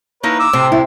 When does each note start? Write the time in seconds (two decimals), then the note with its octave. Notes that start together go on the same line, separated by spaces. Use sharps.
0.23 A#3 D#4 E4 B4 C#5
0.39 D6 E6
0.53 A2 C3 C4
0.72 E4